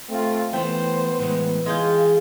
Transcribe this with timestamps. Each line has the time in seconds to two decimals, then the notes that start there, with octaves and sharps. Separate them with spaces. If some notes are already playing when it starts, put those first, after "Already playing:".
0.10 A3 C4 F4
0.53 E3 A3 B3 C5 G5
1.19 A2 E3 G#3
1.66 E3 G#3 F4 G#4 F5 G5